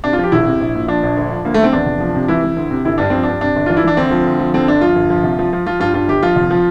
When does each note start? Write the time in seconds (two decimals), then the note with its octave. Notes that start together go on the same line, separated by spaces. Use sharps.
0.04 C3 D4
0.13 F4
0.19 F3 G4
0.32 E1 E4
0.47 C3
0.60 A#1
0.75 A#2
0.88 F3 D4
1.03 A#1
1.17 D2
1.31 F3
1.45 D2 A#3
1.54 A3
1.59 D2
1.64 C4
1.73 E2 D4
1.86 F1
2.00 F3
2.15 C3
2.28 E3 E4
2.44 E3
2.57 D2
2.71 C3
2.85 G1 E4
2.98 G2 D4
3.10 F3 C4
3.23 G2 D4
3.41 C3 D4
3.56 G1
3.66 E3 F4
3.77 E4
3.84 E3 D4
3.97 D2 C4
4.11 F3
4.26 D2
4.39 F3
4.54 D3 C4
4.68 G1 D4
4.81 F3 F4
4.95 G1
5.10 F3
5.24 C2
5.39 F3
5.53 F3
5.66 F3 F4
5.80 G2 F4
5.94 G2 F4
6.08 G1 G4
6.23 F3 F4
6.36 F1
6.50 F3